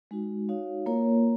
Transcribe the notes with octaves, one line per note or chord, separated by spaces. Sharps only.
G#3 D#4 F#4
D#4 F#4 C#5 F5
A#3 F4 A#4 C#5